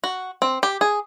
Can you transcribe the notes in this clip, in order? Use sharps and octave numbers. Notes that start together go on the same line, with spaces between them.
F#4
C4
G4
G#4